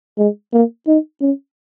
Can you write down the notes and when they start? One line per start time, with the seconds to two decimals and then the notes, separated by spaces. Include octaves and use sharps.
0.18 G#3
0.53 A#3
0.87 D#4
1.21 C#4